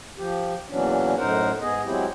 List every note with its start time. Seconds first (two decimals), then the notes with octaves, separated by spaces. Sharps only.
0.18 F3 G4
0.69 E2 A#2 E3 F#3 C#4 D4
1.17 F#2 A2 D#4 A#4 C5 F#5
1.61 G#2 B3 G#4 D#5
1.85 F#3 G#3 C4 E4 G4